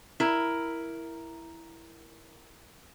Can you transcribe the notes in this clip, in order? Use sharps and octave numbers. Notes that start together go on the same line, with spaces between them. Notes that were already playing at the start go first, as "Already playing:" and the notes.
E4 A#4